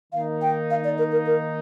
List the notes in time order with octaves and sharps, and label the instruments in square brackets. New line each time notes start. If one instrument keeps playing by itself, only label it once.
[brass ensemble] D#3 A#3 D#4 [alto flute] F5
[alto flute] G5
F5
D5
A#4
A#4
A#4